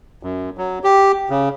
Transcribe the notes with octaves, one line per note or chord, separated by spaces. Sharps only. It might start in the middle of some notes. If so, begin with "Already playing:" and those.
F#2
F#3
G4
C#3